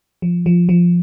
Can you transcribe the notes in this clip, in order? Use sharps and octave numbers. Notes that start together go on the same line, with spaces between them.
F3
F3
F3